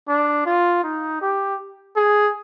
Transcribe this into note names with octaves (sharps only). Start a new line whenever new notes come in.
D4
F4
D#4
G4
G#4